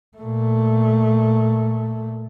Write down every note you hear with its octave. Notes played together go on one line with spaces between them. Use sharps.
A#2 A3